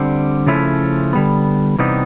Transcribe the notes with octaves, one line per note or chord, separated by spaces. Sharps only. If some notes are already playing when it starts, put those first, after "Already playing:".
Already playing: D3 G3 C4
C#3 F3 A3 C#4 E4
D3 G3 B3
C3 E3 G3 B3 D#4